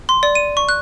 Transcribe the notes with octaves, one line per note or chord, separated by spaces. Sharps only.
C6
D5
D#7
C#6
F#6